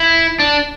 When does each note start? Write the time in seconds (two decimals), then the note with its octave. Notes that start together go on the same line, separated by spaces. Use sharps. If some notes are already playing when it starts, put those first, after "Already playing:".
Already playing: E4
0.39 D4